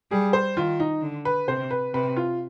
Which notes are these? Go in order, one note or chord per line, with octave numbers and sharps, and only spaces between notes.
G3 G#4
C5
D#3 F4
D#4
D3
B4
C3 C5
B4
C3 B4
F4